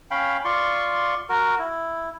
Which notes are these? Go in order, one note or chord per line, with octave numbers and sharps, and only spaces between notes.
C#4 F5 G5 B5
F4 D5 C6 C#6
F#4 A#4
E4